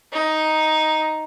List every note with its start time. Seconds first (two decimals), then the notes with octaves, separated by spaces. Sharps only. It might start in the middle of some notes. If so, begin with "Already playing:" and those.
0.13 D#4